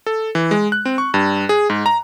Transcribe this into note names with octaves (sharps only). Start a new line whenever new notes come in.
A4
E3
G#3
F#6
C4
C#6
G2
G#4
G#2
A#5